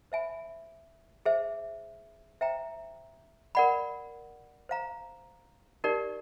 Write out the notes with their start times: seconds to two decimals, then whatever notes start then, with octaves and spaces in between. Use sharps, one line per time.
0.12 C5 E5 G#5 B5
1.26 G#4 C5 E5
2.41 C5 E5 G5 A#5
3.55 A#4 D5 F#5 B5
4.69 C5 F5 A#5
5.84 D#4 G4 A#4 D5